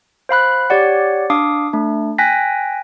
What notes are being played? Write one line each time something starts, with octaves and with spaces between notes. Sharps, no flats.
C5 F5 B5 F#6
G4 C#5 D5 F#5
D4 F5 D6 D#6
A3 D4
G5 G#5 F#6 A#6 B6